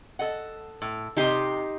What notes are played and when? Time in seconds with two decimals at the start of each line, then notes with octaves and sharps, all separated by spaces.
0.19 A4 D#5 F#5
0.82 A2
1.17 C3 D#4 G4 D#5 C6